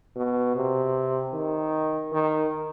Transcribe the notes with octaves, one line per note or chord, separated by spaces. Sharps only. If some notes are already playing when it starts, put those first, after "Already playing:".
B2
C3
D#3
D#3